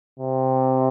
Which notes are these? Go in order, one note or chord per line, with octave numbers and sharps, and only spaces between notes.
C3